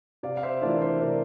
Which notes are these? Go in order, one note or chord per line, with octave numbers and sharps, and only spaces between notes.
C3 D5 F5
F5
C5 E5
E3 A3 D4 F4 A#4 D5
C5 E5
C3 A#4 D5